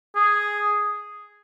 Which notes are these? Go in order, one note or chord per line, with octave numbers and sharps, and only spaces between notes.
G#4